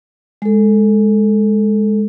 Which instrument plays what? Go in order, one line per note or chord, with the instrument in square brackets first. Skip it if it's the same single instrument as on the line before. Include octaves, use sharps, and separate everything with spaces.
[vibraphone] G#3 A4